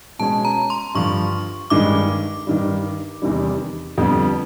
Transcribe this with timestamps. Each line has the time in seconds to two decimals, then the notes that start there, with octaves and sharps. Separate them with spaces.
0.19 B2 G#3 C#4 A5
0.45 A#5
0.70 C6
0.95 G2 D3 F3 C#6
1.70 G2 D#3 G#3 D6
2.47 G2 D#3 G3
3.22 E2 C3 D#3 G3
3.98 F2 D3 G3 B3